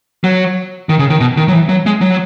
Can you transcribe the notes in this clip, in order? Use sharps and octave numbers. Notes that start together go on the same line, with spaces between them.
F#3
D#3
C#3
D#3
B2
D#3
F#3
E3
F#3
G#3
F#3